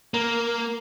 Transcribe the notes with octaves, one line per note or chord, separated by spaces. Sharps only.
A#3